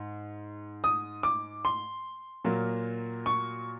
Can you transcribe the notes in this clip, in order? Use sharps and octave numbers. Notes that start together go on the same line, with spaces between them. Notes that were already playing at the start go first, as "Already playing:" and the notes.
Already playing: G#2
D#6
D6
C6
A#2 F#3 A#3
C#6